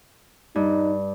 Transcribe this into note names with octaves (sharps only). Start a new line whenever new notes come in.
G2 D#4